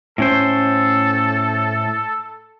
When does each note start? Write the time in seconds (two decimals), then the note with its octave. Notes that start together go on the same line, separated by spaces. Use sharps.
0.18 A2 C#4 A4 C5